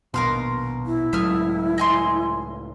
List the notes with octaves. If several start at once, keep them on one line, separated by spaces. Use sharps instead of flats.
D#1 A#1 B2 A#4 F5 C6
E4
C#2 A2 F#3 E5 D#6 F6
D#5 G#5 C6